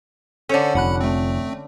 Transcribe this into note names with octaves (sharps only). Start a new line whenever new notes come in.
D3 C#4 A4 C5 D5
F1 F#5 B5 F#6
A3 C4